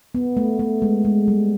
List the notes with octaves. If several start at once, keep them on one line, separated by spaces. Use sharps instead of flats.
B3
A3
A3
G#3
G#3
G3